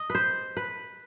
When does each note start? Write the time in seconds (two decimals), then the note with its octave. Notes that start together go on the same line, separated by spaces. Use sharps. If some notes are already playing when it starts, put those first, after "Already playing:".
Already playing: D#5
0.10 B4 C5
0.57 B4